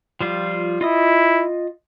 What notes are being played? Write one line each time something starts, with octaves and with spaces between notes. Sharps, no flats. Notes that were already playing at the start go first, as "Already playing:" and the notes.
F3 G3 F4
E4 F4 D#5 D#6